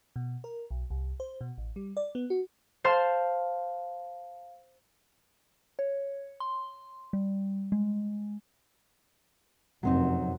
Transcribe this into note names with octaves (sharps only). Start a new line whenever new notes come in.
B2
A#4
B1
C2
C5
B2
A1
G3
D5
B3
F#4
C5 F5 A5 C6
C#5
C6
G3
G#3
F1 F#2 F#3 C4 D#4